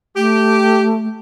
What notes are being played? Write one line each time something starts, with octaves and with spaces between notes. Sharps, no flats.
A3 G4